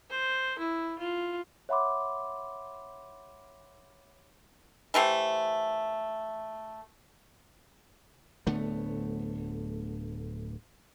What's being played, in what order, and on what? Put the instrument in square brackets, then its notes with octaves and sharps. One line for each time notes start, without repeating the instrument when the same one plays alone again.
[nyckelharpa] C5
E4
F4
[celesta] C#5 E5 F#5 B5 C6 D6
[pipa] E3 A3 G4 C5
[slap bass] D1 D3 A3 B3